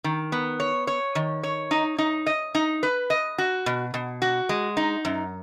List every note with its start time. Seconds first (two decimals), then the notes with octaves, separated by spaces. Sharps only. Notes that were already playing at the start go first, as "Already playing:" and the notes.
0.04 D#3
0.32 B3
0.60 C#5
0.87 C#5
1.15 D#3
1.43 C#5
1.71 D#4
1.98 D#4
2.26 D#5
2.55 D#4
2.83 B4
3.10 D#5
3.38 F#4
3.66 B2
3.94 B2
4.22 F#4
4.49 G#3
4.77 D#4
5.05 F#2